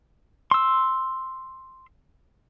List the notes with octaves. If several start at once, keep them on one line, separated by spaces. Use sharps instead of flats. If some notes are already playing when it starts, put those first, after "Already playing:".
C6 E6